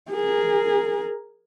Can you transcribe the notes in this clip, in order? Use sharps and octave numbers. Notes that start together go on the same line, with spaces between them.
G#4 A#4